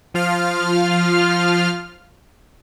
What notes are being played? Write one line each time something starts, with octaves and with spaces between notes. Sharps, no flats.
F3 F4 F5 F6